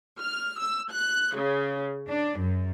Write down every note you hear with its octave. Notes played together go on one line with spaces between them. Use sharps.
F6
E6
F#6
C#3
D4
F#2